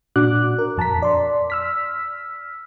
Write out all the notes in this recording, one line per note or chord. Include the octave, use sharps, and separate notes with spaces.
A#2 D4 F#4 D6 F#6
A#4
F2 A5 A#5 B6
D5 C6
E6 F6 B6